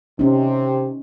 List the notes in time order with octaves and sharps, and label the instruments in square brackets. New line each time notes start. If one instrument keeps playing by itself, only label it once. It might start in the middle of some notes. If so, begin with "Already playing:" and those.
[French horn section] C3 [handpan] C#4 D#4